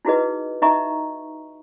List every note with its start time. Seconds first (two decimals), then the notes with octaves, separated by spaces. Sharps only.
0.05 D#4 E4 F#4 G#4 B4 D#5
0.62 D#4 D#5 E5 A#5 C#6